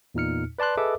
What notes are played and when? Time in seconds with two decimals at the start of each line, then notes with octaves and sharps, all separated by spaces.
0.14 E2 A#2 D#4 F6 C#7
0.59 B4 D5 A5 C6 F#6
0.77 G#4 A4 B4 D#5 E5 D6